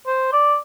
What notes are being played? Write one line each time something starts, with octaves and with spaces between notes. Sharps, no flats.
C5
D5